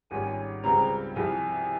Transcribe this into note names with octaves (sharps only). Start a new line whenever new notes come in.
G#1 G#2 G3 C#4 F4 G#5
C#2 C#3 G3 C4 A#5
C2 C3 F3 G#5